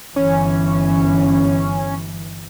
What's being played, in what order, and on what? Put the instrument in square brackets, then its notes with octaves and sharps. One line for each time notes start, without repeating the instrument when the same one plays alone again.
[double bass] G1 E3 [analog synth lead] C#4